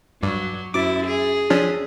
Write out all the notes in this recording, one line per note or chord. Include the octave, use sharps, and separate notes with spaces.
G2 F#3 C#6 D6
F#2 C#4 E4 F#4 D6 A6
G#4
F3 C#4 D4 C#5 E6 B6